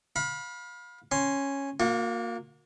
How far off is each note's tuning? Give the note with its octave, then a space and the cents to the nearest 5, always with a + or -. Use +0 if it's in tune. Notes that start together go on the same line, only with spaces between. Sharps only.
F5 +30 B5 -20
C#4 -5 C6 +0
A#3 -5 F#4 -45